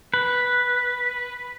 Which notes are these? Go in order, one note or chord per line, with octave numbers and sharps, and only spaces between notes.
B4